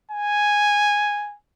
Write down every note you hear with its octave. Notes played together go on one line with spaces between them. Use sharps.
G#5